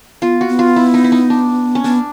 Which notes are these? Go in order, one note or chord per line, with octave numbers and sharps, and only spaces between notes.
B3 F4
F#4
B3
F4
E4
D#4
E4
D#4
D4
C#4
B3 D4